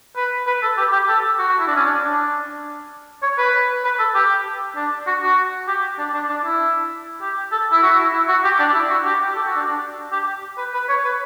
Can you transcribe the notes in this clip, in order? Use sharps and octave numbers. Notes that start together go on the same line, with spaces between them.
B4
B4
A4
G4
G4
A4
F#4
F#4
E4
D4
C#4
D4
D4
C#5
B4
B4
A4
G4
D4
F#4
F#4
G4
D4
D4
D4
E4
G4
A4
E4
F#4
E4
E4
F#4
G4
D4
E4
F#4
G4
G4
A4
F#4
D4
D4
G4
B4
B4
C#5
B4